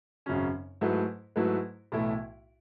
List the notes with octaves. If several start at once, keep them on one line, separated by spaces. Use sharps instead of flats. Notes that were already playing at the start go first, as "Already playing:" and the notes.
G#1 F#2 C#3 F#3 C#4
G#2 F#3 A3 E4 B4
G#2 F#3 A3 E4 B4
B1 A2 E3 A3 E4